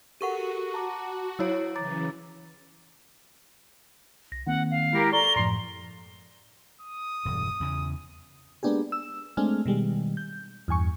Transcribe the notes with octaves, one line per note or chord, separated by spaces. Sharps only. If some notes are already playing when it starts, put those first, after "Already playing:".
F#4 G4 A4 A#4 F#5 C#6 D#7
A5 A#5 D6
F#3 E4 C#5 E6 D7
C#3 E3 A#5 D6 A6
C2 A#6
D#3 A#3 C4 F#5
F5
G#3 E4 G4 A#4
A4 D5 A#5 C#6 G7
F#2 A2 F3 C6
D#6
E1 G2
E2 C#3
G#3 A#3 B3 D4 G4 G#4
E6
G#3 A3 C4 D4 G#5 F6
B2 D#3 G3 G#3
G6
E2 G2 G#5 C#6